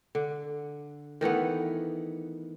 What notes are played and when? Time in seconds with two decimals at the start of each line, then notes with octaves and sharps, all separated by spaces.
0.15 D3
1.21 D#3 E3 A3 B3